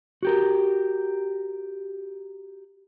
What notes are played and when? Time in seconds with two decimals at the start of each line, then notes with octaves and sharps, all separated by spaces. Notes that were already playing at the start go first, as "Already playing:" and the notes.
0.23 F#4 G4 A#4